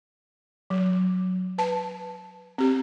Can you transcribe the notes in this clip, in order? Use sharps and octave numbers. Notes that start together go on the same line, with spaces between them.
F#3
B4 A5
C4 G4